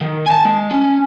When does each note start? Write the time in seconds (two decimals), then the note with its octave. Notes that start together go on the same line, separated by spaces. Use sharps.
0.01 D#3
0.27 G#5 A5
0.45 G#3
0.71 C#4